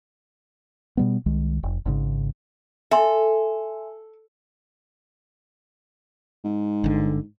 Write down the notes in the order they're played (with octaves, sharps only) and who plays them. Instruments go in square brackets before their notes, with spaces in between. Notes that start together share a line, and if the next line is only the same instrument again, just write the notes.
[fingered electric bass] B2 G3 B3
C2 D#3 G#3
F1
G#1 G#2 C#3
[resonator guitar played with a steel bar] A4 [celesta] E5 G#5 C6
[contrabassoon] G#2
[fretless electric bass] G1 D3